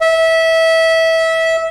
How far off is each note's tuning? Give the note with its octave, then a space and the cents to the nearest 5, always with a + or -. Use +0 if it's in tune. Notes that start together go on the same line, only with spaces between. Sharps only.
E5 -20